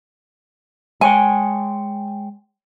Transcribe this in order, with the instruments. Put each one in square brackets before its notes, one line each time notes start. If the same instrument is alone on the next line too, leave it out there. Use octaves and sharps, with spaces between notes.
[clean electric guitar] G#3 C#5 G5 [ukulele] G#5